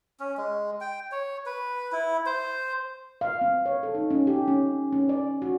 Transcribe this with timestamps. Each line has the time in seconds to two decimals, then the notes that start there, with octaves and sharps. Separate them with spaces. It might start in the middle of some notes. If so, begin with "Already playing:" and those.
0.20 C#4
0.37 G#3
0.81 G5
1.12 C#5
1.46 B4
1.92 E4
2.26 C5
3.21 F5
3.41 C4
3.66 C#5
3.83 A4
3.95 D#4
4.11 C#4
4.27 G4
4.48 C#4
4.93 C#4
5.09 D5
5.42 F#4